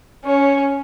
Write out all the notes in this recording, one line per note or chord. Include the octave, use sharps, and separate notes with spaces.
C#4 C#5